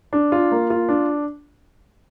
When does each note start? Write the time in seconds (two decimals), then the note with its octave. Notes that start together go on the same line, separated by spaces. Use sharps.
0.13 D4
0.32 F4
0.52 A#3
0.70 F4
0.89 D4